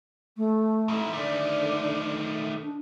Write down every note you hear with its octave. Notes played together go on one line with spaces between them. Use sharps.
A3
G#2 E4
D3 D#3 A3
D4